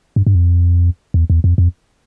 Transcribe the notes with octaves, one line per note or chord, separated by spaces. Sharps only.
G2
G2
F2
E2
E2
F2
F2